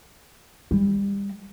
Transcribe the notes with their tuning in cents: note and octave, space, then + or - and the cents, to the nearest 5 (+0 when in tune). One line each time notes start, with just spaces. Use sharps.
G3 +30